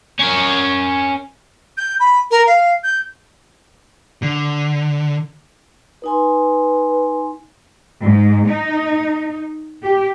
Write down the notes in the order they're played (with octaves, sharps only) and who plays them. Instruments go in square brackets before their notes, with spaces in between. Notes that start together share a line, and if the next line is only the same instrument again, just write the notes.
[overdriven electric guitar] C#4 A#4
[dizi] G6
B5
A#4
F5
G6
[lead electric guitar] D3
[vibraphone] D#4 G#5 C6 [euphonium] B4
[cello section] G#2
D#4
G4